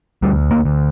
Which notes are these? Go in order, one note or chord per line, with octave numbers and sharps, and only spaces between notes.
D2 G3
A#3
D2